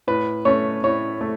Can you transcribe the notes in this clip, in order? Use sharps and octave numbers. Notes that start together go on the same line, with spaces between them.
A2 B4
A3 C#4 C#5
A2 C#5
A3